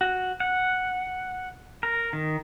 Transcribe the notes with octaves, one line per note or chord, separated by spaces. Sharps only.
F#4
F#5
A#4
D#3